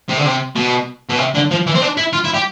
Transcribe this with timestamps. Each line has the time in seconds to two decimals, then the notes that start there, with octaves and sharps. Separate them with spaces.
0.09 C3
0.17 D3
0.26 C3
0.55 B2
1.09 B2
1.18 C3
1.35 D3
1.51 F3
1.67 E3
1.75 C4
1.82 D4
1.97 E4
2.13 F4
2.24 E4
2.34 G4